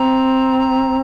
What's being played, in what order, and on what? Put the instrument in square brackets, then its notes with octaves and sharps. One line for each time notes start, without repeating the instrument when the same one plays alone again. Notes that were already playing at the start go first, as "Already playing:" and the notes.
Already playing: [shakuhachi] C4 [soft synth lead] A#5
[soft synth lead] A#5